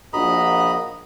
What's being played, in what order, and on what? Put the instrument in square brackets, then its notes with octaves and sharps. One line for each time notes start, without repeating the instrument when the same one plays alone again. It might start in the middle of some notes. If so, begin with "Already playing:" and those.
[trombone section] A#1 F#4 [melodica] D#5 A#5 B5